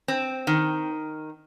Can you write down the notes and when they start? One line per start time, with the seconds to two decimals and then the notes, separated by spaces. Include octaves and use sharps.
0.08 C4
0.47 D#3